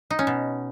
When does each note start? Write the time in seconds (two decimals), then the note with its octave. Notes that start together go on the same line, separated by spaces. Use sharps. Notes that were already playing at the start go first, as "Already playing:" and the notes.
0.11 D#4
0.19 C#4
0.27 B2